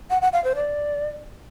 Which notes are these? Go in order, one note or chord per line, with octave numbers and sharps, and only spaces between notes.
F#5
F#5
F5
C5
D5